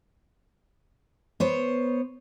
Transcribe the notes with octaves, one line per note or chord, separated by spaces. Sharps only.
B3 C5 C#5